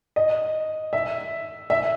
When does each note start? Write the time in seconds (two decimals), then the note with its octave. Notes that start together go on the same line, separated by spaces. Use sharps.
0.16 D#5
0.93 E5
1.70 E5